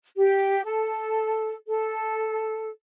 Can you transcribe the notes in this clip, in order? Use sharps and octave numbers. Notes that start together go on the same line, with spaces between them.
G4
A4
A4